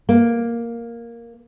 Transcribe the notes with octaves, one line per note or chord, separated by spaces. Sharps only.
A#3